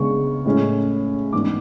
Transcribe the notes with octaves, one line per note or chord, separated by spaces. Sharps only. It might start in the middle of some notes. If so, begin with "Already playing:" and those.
Already playing: C#3 G#3 B3 D4 C#6
A2 G#3 C#4
G#2 E3 B3 D4 D6